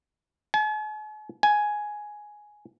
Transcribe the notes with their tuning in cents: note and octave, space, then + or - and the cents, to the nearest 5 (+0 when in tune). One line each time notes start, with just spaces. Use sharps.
G#5 +45
G#5 +5